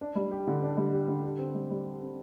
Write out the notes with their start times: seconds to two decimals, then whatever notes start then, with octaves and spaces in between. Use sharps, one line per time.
0.01 D4
0.15 G3
0.31 G4
0.47 D3
0.63 D4
0.77 G3
0.93 G4
1.08 D3
1.24 G4
1.39 C4
1.55 G3
1.70 G3
1.85 G4
2.01 C4